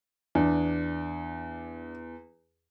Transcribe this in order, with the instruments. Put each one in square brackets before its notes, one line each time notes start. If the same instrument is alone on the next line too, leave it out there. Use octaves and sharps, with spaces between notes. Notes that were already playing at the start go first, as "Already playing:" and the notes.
[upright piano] E2 [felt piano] D4